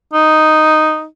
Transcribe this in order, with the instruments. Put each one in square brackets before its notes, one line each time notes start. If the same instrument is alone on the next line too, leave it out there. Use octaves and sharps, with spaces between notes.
[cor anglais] D#4